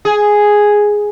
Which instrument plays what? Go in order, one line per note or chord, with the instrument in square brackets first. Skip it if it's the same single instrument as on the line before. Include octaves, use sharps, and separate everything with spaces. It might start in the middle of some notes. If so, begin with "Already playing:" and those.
[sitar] G#4